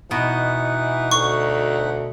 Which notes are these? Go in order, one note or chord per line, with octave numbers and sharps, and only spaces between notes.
B2 E3 D#4 F#5
D2 C#6